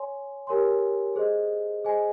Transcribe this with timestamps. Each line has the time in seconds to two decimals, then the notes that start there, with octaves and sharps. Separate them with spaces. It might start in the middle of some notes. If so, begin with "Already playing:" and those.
Already playing: C#5 G#5 C6
0.47 G4 A#4 C#5 G#5 C6
1.16 G#4 C5 D#5
1.84 G#4 C5 D#5 G#5